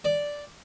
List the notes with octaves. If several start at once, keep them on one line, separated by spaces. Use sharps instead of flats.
D5